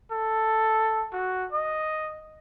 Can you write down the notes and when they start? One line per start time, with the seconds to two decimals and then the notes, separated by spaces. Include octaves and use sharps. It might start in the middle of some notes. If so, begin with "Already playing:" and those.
0.11 A4
1.13 F#4
1.52 D#5